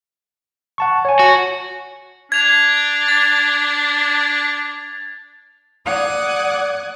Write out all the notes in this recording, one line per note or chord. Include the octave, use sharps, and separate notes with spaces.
F#5 A5 C#6
C#5 G#5
F#4
D4 G#6 F7
A6
D5 F#5 D#6 F#6 G#6